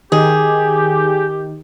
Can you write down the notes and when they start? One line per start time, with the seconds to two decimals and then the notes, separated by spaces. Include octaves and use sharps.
0.12 D#3 G4 G#4